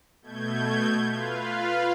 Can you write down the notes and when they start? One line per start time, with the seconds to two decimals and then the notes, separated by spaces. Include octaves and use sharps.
0.22 B2 A3 G6 G#6
1.09 F4 B4 F5